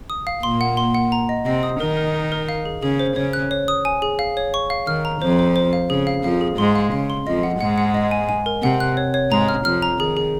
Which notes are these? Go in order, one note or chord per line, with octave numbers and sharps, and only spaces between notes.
D#6
F5
A#2 A#3 C6
F#5
C6
F#5
A#5
D#5
C3 C4 D#5
D#6
D#3 D#4 A#4
A#4
A#4
A#4
F5
G#4
C#3 C#4 G#4
C5
C#3 C#4 C#5
F#6
C#5
D#6
G#5
G#4
F5
C#5
C#6
F5
D#3 F6
A#5
F2 F3 C5
C5
C5
F5
C#3 G#4
F5
F2 F3 F5
G#4
G#2 G#3 C6
F5
C#3 F5
C6
F2 F3 D#5
F#5
G#2 G#3 F#5
F#5
D#5
G#5
G#5
A#4
C3 C4 F#5
F#6
C#5
C#5
G#2 G#3 A#5
F6
F2 F3 F6
A#5
D#3 G#4
G#4